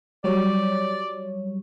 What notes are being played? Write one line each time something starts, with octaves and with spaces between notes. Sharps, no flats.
F#3 G3 C#5 D5